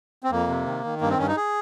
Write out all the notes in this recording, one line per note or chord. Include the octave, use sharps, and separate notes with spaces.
C4
F2 A#3
C3
D#3
D#3
G2 A#3
C4
G2 C#4
D#4
G#4